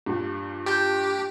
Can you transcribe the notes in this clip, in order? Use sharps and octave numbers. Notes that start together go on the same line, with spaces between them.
G2 A#2
D4 G4 G6